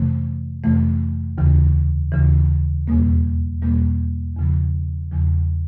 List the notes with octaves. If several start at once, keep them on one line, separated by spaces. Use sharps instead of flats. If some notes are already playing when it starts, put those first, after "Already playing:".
Already playing: F2 C3 E3 A3
F2 C3 E3 A3
D#2 C#3 E3
D#2 C#3 E3
E2 B2 G3 A#3
E2 B2 G3 A#3
E2 C#3 F3
E2 C#3 F3